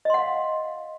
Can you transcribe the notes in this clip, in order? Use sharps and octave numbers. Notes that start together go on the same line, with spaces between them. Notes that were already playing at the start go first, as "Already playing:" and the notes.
D#5 F5 F#5 C6